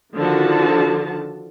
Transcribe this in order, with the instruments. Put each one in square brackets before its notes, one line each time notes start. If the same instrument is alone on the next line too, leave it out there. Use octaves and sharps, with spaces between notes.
[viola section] D3 D#3 F3 F#4 A5